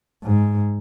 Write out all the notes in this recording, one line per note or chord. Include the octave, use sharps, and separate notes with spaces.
G#2